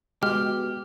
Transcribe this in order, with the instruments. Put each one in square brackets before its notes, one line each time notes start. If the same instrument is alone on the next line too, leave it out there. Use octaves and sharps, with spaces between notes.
[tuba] B2 [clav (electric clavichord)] G#3 [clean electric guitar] G4 [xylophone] F6